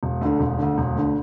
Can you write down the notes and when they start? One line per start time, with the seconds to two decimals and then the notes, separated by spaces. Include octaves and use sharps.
0.03 E1
0.21 D2 D3
0.39 E1
0.58 D2 D3
0.78 E1
0.96 D2 D3